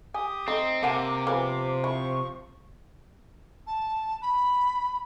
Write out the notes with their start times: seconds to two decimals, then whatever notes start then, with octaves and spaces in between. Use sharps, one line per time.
0.14 G4 G#5 D#6
0.48 A3 C4 D#4
0.83 C3 A#3 E5 F#5 A5 D6
1.27 F3 A#3 B3 G#4
1.84 E4 C#6
3.67 A5
4.21 B5